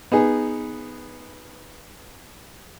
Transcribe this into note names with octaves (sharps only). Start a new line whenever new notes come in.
B3 D#4 G#4